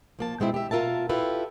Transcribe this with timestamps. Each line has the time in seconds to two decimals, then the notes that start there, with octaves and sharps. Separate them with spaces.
0.19 F3 A#3 A5
0.40 B2 G#3 C4 E4
0.54 G4 E5
0.71 B2 F4 A#4 E5 A5
1.09 E4 F4 G4 A4 B4